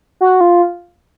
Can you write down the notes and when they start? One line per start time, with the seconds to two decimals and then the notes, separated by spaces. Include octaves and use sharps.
0.21 F#4
0.41 F4